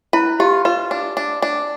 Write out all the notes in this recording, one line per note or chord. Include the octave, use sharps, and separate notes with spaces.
E4 B4
F4 G4
F4 B4
D4
D4
D4